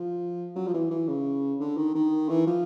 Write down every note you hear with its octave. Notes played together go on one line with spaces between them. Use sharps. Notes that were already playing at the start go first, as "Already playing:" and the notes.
Already playing: F3
F#3
F3
E3
E3
C#3
D3
D#3
D#3
E3
F3